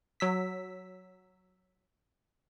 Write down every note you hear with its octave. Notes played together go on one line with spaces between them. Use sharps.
F#3 E6 B6